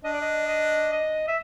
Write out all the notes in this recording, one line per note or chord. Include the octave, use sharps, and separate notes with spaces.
D4 D#5
D5
D#5
D#5
D#5
E5